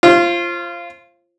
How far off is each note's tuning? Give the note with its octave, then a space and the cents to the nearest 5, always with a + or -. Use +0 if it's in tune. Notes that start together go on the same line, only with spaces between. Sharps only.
F4 -20 C5 +30